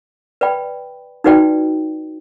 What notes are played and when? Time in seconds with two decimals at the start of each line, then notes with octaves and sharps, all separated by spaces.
0.41 B4 D5 G5 B5
1.24 D#4 F#4 B4 D5 G5